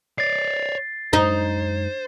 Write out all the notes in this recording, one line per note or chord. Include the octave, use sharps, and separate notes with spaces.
C#5 D5 A6 C7
F#2 G#3 D#4 C5